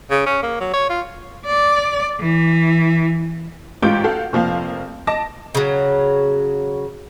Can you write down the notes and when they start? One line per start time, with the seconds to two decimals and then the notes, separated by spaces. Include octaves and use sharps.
0.10 C#3
0.26 C#4
0.42 A#3
0.60 F#3
0.73 C#5
0.90 F4
1.46 D5
2.20 E3
3.82 A1 G#2 F4 G4 G6 D7
4.04 F#4 A4 F5 F#5
4.33 F1 F3 A#3 F5
5.07 D#5 A5 D6 A#6
5.55 C#3 F#3